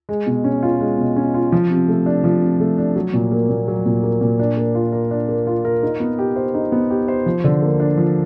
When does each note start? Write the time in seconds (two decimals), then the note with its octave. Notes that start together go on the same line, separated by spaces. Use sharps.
0.09 G#3
0.27 B2
0.44 C#4
0.63 F4
0.81 G#3
0.98 B2
1.16 C#4
1.34 F4
1.52 F3
1.70 C3
1.88 A3
2.06 D4
2.24 F3
2.42 C3
2.60 A3
2.78 D4
2.96 F#3
3.14 A#2
3.31 A#3
3.49 A#2
3.68 F#3
3.86 A#2
4.03 A#3
4.21 A#2
4.39 D4
4.57 A#3
4.75 F4
4.92 A#4
5.11 D4
5.29 A#3
5.47 F4
5.65 A#4
5.83 D#4
6.00 B3
6.19 G4
6.36 C5
6.54 D#4
6.72 B3
6.90 G4
7.08 C5
7.26 F3
7.44 D3
7.62 A#3
7.80 D4
7.97 F3